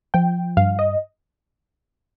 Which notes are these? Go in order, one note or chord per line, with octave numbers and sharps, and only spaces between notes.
F3 G5
G2 F5
D#5